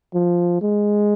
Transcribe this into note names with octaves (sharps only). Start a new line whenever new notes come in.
F3
G#3